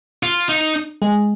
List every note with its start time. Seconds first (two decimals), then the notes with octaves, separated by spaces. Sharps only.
0.23 F4
0.49 D#4
1.02 G#3